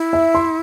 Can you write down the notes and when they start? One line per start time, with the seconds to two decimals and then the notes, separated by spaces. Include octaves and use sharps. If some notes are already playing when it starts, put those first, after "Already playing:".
Already playing: E4
0.13 E5
0.35 C6